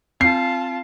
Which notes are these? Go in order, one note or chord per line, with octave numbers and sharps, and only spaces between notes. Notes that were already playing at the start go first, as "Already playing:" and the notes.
C4 F4 A5 C7